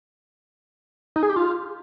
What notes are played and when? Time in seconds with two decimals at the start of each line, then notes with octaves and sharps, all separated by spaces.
1.16 D#4
1.23 G#4
1.29 G4
1.36 F4